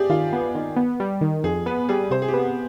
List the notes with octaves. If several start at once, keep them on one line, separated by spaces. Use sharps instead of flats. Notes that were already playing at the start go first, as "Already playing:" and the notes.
Already playing: G4 G#4 D5
D#3 F4
B3
D#3
B3
G3
D#3
F2 G#4
B3 B4
G3 G#4
C3 C5
G#4
G4
B3